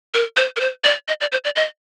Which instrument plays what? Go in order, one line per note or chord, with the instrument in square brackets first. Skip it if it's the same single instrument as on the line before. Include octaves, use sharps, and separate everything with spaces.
[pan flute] A#4
C5
A#4
C5
D5
D#5
D5
C5
D5
D#5